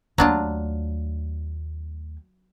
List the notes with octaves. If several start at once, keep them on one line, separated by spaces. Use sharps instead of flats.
D#2 F#3 A3 D4 F4